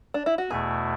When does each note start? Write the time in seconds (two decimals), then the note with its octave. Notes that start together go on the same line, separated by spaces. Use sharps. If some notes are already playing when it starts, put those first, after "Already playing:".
0.14 D4
0.26 E4
0.38 F#4
0.50 E2 B2 A3 E4 G#4